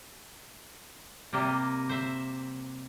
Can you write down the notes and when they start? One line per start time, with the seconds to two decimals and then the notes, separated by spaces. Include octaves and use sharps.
1.33 C3 G3 A#3 D#5
1.89 C5 E5